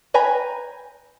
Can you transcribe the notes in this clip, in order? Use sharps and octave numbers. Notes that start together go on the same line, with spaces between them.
B4 G5 G#5 A#5 B5